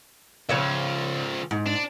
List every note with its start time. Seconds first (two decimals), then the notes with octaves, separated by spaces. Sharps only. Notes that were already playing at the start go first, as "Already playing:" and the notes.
0.49 C#2 C#3 F3 C#5 E5
1.51 G#2
1.66 D4